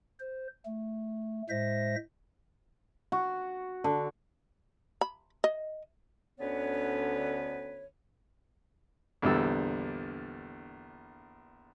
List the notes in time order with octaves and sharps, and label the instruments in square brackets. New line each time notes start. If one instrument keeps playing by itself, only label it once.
[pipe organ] C5
A3
A2 G#3 C5 E5 A#6
[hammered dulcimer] F#4
D3
[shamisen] B5
D#5
[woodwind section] D2 D3 B3 C#4 B4 C#5
[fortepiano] A#1 E2 D3 G3 E6